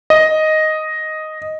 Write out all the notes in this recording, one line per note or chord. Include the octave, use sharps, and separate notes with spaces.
D#5